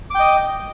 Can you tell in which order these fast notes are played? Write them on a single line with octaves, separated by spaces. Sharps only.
D6 G5 D#5